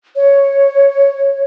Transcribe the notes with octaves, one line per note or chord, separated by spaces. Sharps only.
C#5